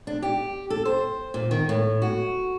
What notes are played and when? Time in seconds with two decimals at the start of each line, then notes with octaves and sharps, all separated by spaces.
0.07 D4
0.23 G4
0.70 A4
0.85 C5
1.34 A#2
1.51 D#3
1.69 A2
2.02 F#4